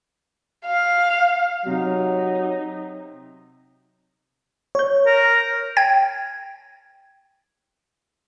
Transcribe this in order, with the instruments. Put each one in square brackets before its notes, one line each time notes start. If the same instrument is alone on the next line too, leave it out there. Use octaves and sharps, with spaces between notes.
[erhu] F5
[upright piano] C3 [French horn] F#3 [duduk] D#4
[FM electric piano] C#5 G6
[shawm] A#4
[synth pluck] G5 G#6